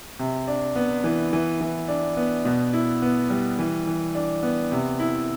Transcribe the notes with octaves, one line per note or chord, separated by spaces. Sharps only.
C3
D4
B3
E3
E3
E3
D4
B3
B2
E4
B3
G3
E3
E3
D4
B3
C3
E4